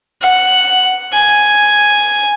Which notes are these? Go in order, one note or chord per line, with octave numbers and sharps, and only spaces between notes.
F#5
G#5